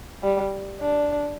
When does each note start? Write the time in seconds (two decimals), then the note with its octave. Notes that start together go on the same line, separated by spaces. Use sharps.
0.23 G3
0.81 D4